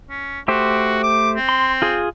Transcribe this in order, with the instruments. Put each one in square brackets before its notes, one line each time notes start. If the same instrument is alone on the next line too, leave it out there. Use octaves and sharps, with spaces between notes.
[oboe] C#4
[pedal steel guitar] A3 G4 C5 [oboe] F#4
[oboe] D6
C4
[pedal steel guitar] C6
F4 G#4